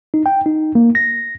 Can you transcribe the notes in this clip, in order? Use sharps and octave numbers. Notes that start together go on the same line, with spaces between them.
D#4
G5
D#4
A#3
A#6